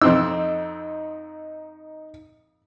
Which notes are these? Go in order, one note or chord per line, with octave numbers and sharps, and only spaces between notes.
F2 C4 D#4 E6